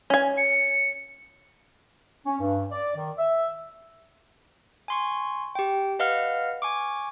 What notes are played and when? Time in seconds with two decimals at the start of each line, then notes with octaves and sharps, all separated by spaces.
0.10 C#4 G#5
0.38 C#7
2.25 C#4
2.39 G2
2.72 D5
2.96 D#3
3.18 E5
4.88 G#5 C6 C#6
5.55 G4 G5
5.99 B4 D#5 F5 F#5 F6
6.62 G#5 C#6 D6